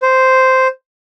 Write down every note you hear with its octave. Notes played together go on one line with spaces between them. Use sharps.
C5